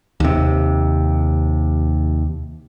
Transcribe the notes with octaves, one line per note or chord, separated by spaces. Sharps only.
D#2 C3